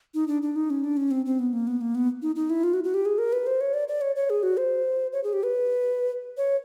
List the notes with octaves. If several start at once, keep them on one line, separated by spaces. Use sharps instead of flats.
D#4
D4
D4
D#4
C#4
D4
C#4
C4
C4
B3
A#3
B3
A#3
B3
D#4
D#4
E4
F4
F#4
F#4
G4
G#4
A#4
B4
C5
C#5
D5
D5
C#5
C#5
G#4
F#4
C5
C#5
G#4
G4
B4
C#5